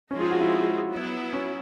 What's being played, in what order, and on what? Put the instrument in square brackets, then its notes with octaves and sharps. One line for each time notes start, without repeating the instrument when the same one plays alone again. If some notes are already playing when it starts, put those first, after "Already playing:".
[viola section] F3 G#3 C4 D#4 G#4 [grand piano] C#4
[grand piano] F4
F#4
E4
[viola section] F#3 B3 E4
[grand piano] C#4